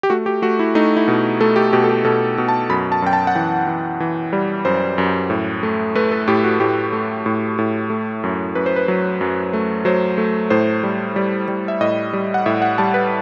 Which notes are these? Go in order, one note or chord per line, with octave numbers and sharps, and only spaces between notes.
G4
A3 F#4
G4
A3 F#4
E4
A3 D#4
E4
B2
A3 A4
G4
B2 G4
A4
G4
B2 A4
B2
A5
F#2 B5
A5
F#2 G5
A5
F#5
E3 G5
E3
E3
G3
F#2 C5
F#2
A2
A3
A3 B4
A4
A2 G4
F#4
A2 G4
A3
A2
A2
A3
F#2
F#2 B4
C5
B4
F#3
F#2
A3
F#3 C5
A3
A2 C5
G3
G3
G3
E5
A2 D#5
G3
F#5
A2 E5
F#5
G3 A5
B4